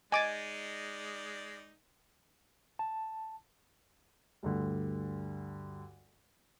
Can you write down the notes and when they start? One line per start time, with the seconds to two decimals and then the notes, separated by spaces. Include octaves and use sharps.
0.12 G#3 D#4 D5 D#5 G#5 D6 G#6 A6
2.79 A5
4.43 D2 G2 D3